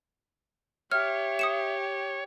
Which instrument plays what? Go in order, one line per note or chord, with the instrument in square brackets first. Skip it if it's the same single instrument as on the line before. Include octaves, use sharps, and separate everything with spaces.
[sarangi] G4 [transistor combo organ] C#5 [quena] E5 [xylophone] F6
[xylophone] D#6 C#7 E7